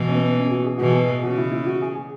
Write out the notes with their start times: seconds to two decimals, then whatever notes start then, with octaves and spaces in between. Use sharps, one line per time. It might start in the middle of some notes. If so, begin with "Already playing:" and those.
Already playing: B2 E3
0.09 C#4
0.15 B3
0.37 C#4
0.47 G#4
0.51 F#4
0.66 G#4
0.78 B2 E3 F#4
0.90 G#4
1.23 C#3 F#4
1.38 E4
1.52 E4
1.66 F#4
1.82 G#4
1.95 G#4